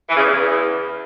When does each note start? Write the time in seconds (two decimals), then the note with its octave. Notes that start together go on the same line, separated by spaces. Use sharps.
0.09 E3
0.16 C#3
0.23 E2